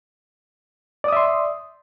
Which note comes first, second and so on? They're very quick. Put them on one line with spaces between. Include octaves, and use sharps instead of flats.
D5 D#6 E5 C6